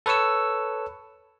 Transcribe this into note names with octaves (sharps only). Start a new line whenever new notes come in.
A4 B4 C#5 C#6 E6